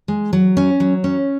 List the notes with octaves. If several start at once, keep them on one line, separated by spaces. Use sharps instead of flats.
G#3
F#3
C#4
F#3
C#4